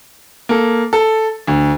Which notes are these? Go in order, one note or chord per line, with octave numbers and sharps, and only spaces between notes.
A#3 A4
A4
D2